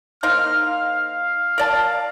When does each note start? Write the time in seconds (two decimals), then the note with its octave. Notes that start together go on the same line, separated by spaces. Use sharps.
0.23 A#3 D#4 C5 F6
0.65 F5
1.58 A#4 D5 A5